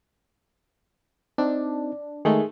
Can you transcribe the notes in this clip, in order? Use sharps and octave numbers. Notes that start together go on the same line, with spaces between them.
C4 D4 D#4
D#3 G#3 A3 G#4